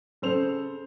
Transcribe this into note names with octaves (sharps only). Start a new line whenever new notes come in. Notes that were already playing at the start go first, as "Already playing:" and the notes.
C#3 A4 C5 F7